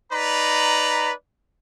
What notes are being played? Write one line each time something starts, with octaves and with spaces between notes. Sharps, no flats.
D#4 B4 D5 A#5 B5